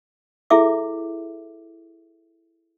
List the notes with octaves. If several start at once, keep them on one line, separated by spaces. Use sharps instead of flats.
E4 G#4 A4 E5 D6